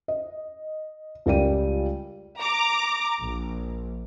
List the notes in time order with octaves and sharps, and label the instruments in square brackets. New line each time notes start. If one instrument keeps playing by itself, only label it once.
[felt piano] D#5
C#2 G3 A#4 D5 G5 D#7
[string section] A#5 D6
A#1